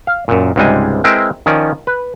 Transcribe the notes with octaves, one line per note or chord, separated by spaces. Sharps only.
F5
F#2 A#2
C#2 G#2 C3 G3 G#3 G#5
G#3 C4 E4 A#4 B4 G5
D#3 F3 C#4 D5
B4